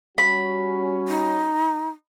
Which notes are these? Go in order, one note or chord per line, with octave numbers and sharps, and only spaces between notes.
G3 C#4 F#4 B5
D#4